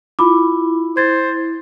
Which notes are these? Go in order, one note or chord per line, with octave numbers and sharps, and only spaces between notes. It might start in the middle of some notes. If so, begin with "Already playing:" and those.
E4 F4 B5 D6
C5 G#6 A6